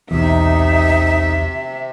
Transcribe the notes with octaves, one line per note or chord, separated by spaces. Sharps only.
B1 E2 C3 D#4 E5